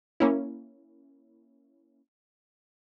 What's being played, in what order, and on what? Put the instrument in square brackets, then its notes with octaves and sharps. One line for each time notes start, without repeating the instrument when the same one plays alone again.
[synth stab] A#3 C#4 E4